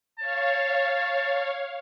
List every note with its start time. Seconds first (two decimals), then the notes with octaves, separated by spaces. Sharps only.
0.19 C#5 F5 A5